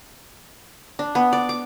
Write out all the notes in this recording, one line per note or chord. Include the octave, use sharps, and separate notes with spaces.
D4
B3
D5
D6